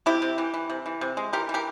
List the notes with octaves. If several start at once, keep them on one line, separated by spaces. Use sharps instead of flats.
C3 E4 G4
C3
E3
E3
C3
E3
C3
G#3
E3 G4 A#4
E3
G4 A#4